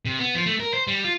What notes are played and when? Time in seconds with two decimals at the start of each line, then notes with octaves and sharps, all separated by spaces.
0.05 C3
0.19 B3
0.35 F3
0.46 A3
0.60 A#4
0.74 C5
0.87 G3
1.04 F4